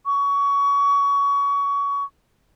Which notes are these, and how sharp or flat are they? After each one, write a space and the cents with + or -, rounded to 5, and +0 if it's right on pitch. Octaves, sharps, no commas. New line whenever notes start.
C#6 +25